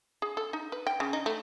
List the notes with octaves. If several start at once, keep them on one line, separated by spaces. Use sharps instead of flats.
G#4
A4
D#4
B4
G5
C#3
D#4
A3